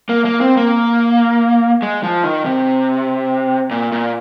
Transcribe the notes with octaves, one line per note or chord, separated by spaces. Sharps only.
A#3
A#3
C4
A#3
G#3
F3
D#3
C3
A#2
A#2